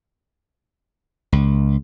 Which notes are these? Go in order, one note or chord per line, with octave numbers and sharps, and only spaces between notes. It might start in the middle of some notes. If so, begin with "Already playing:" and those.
C#2